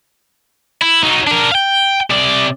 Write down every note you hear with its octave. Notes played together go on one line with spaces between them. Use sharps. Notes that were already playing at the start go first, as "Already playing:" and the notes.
E4
F#3 D#4
D4 A#4
F5 G5
C3 D5